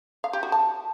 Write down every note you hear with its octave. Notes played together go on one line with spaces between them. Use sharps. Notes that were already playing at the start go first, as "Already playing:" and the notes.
F5
G4
F#4
A5